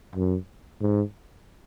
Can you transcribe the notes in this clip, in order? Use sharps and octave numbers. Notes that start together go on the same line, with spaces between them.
F#2
G#2